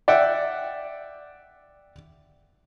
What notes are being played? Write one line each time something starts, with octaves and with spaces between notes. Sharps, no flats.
D5 E5 F#5 G5